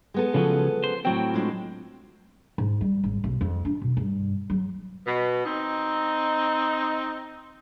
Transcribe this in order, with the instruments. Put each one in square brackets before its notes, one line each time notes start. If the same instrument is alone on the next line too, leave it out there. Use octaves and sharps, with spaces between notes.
[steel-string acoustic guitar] G#3 B3 A4
[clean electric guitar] C#3 F3 F#3
C5
[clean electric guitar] A2 F#3 C4 [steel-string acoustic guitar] G5
[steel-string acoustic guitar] G#3 D4 F4
[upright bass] G#2
G3
G#1
B1
F2
D4
B2
G2
F#3
[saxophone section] B2
C4 D#4